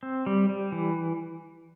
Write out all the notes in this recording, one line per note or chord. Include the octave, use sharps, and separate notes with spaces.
C4
G3
G3
E3